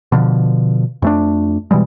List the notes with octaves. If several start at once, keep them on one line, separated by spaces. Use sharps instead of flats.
B2 D3 F3
F2 A3 D4
B2 E3 G3 G#3